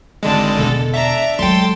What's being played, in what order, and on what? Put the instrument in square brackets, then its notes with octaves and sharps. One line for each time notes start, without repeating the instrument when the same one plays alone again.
[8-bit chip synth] G#1 D3 G#3 [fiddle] D4 A5
[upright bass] E1 [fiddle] A4
[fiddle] D4 A#5 [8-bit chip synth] E5
[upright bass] F#3 G#3 [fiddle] A4 [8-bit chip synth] G5 C6